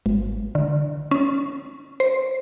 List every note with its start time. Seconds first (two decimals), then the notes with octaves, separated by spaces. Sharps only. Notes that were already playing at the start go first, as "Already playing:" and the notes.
0.06 G#1
0.55 D3
1.11 C#4
2.00 C5